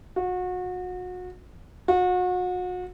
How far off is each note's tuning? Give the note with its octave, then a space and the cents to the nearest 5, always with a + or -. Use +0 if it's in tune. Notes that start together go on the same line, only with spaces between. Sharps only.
F#4 -30
F#4 -35